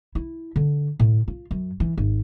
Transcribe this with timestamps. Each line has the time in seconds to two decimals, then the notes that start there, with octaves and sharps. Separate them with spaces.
0.15 E4
0.56 D3
0.99 A2
1.28 F4
1.51 F#2
1.80 E3
1.97 G#1